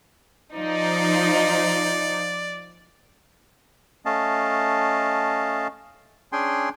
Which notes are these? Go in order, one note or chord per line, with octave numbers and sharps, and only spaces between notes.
F3 D#4 D5
A3 C#4 D#5 F5 A5
C#4 D4 G#4 G5 G#5 C6